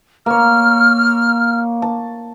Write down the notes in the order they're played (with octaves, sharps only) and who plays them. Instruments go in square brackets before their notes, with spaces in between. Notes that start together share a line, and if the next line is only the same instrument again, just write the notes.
[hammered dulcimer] A#3 C#5 [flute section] F6
[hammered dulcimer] A5